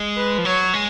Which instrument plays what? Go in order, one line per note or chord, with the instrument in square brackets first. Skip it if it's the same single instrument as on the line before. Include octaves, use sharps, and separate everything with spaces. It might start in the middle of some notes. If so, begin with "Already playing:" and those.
Already playing: [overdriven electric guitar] G#3
[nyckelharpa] B4
[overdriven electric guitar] F3
[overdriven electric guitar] F#3 [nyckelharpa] C#5
[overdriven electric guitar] G#3